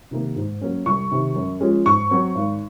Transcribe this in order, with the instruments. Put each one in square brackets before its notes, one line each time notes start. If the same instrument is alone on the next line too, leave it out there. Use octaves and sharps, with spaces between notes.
[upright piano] C3 D#3 A#3
G#2
F#3 A#3 C#4
C2 C#6
C3 D#3
F#2
F3 G#3 C#4
G#2 C#6
F#3 C4
G#1